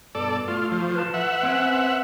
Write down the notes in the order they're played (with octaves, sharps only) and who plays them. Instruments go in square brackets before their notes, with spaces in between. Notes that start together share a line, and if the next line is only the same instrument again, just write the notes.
[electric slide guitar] G2 B2 [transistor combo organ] A4 D5
[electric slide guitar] A3 [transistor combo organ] F4
[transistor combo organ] F3
[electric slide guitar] B4 A5
[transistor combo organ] E5 F#5
[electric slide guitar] C4 C#4 B4